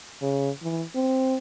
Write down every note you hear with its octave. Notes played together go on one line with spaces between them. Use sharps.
C#3
E3
C4